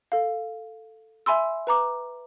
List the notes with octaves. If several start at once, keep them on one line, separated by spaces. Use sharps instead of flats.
A4 F5
E5 G#5 B5 C6 E6
B4 A#5 D6